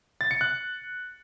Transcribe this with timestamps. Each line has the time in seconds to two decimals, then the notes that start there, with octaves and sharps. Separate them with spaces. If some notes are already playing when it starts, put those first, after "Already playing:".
0.21 A6
0.31 C#7
0.41 F#6